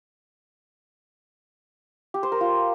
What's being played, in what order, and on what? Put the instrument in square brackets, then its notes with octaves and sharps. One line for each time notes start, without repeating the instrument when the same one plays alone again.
[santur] G4
C5
A#4
F4